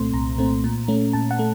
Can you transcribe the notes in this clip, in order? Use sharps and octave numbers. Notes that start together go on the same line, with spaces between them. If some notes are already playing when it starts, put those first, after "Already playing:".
Already playing: C2 A#2 A3 C4 C6
C2 A#5
A#2 A3 C4
A#2
A3 C#4
A#2 A5
F#5
A3